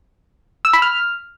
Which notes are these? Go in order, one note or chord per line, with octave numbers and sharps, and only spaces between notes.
E6
B5
F6